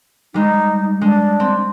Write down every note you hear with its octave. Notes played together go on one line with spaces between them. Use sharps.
G3 G#3 D#4
G#3 D4
C4